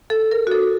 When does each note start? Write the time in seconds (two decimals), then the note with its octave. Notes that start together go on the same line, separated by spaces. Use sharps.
0.10 A4
0.31 A#4
0.47 F#4
0.51 A4